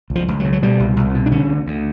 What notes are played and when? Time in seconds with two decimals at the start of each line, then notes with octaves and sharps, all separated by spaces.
0.10 C#2
0.15 F3
0.28 C#2
0.40 F#3
0.45 C#3
0.53 F#3
0.62 B2 G3
0.80 C2
0.96 C2
1.15 B2
1.26 D4
1.32 D3 C#4
1.49 D2
1.67 D2